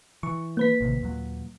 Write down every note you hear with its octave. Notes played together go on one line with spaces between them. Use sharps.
E3 C#6
A#3 B4 B6
A1 C3 D#3
D#2 A#2 F#3